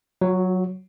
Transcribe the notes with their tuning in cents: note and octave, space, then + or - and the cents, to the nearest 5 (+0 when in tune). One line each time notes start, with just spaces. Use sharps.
F#3 +0 F#4 -45